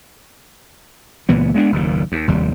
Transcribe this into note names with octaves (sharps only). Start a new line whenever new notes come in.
C#2 A#2 E3 B3
G#3 B3 C4 D4
F#1 D#2 A#2
D#2
F1 D#2 G3